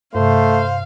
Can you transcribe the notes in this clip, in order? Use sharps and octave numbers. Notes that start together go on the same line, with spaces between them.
G2 C3 A3 C5 F5